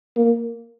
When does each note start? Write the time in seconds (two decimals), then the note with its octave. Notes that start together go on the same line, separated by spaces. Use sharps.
0.16 A#3